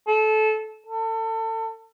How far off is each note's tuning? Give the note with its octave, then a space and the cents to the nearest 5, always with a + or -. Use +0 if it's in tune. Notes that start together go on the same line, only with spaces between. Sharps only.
A4 -25
A4 +30